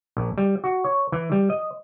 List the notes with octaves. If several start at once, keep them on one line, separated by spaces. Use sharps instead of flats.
A#1
G3
F#4
C#5
E3
G3
D#5